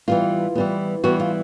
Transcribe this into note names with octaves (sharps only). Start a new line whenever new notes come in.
E3 G3 B3 F4
E3 G3 B3
E3 G3 B3 F#4
F4